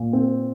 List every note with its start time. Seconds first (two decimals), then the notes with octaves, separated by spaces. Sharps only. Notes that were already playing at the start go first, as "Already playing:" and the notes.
Already playing: A#2
0.13 C4